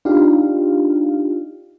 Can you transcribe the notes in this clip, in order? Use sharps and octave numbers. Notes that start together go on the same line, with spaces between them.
D4 D#4 F4 G4 F5